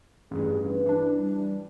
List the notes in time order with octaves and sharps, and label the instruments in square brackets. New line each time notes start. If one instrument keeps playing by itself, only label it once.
[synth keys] A1 G2 [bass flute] G#4
[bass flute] B4
[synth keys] E3 D4
[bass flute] G3